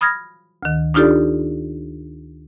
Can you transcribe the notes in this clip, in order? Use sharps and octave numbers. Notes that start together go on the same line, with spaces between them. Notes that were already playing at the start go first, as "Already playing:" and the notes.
B5 D#6 F6 G#6 A#6
D2 D#3
D4 D#4 F4 G4 A4 D5